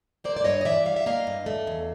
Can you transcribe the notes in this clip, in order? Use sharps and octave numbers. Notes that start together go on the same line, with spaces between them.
A#3 C5 D5
D5
G2 C#5 D#5
D#5
E3 D5 E5
G3 F5
E5
A#3 D#5 F5
G2
A3
E2